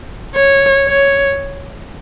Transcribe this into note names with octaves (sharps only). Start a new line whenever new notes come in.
C#5
C#5